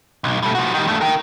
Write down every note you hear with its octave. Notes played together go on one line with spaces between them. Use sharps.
B1
G3 A3
F3 F#4
D#3 G3
G2 A3
A#4 G5